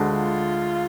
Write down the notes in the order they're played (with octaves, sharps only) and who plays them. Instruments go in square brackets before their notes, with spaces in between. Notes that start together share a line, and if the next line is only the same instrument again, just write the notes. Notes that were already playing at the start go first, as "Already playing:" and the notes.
Already playing: [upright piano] D2 D3 G#3
[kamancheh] F4